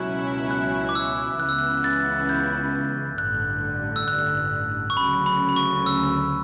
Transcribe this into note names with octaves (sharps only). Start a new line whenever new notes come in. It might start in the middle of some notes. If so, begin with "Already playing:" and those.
Already playing: C#2 B2 F#3 C#4 E4 F#6
F#6
D6
E6
C#2 C#3 E3 B3 E4 F#6
E6
F#6
F#6 A6
G6
A1 G2 D3 F#6
E6
F#6
C#6
D2 C#3 F#3 B5
B5
B5
C#6
E6